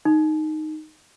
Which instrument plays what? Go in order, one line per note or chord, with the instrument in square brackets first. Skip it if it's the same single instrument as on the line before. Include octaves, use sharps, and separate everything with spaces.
[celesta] D#4